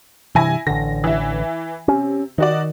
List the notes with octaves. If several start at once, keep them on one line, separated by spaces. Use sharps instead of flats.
G2 C3 E3 E4 G#5 A#6
A1 D3 A#6
E3 E5
C3 C#4
D#3 D#4 F#4 D5